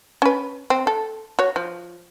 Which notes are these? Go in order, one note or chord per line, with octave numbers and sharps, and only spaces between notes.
C#4 B4
C4
A4
F#4 C#5
F3